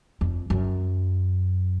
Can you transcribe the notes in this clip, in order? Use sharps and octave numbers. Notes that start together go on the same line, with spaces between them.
F2
F#2